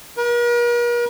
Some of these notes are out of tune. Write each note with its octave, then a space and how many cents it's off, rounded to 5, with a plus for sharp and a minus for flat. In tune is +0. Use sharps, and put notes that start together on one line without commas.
A#4 +45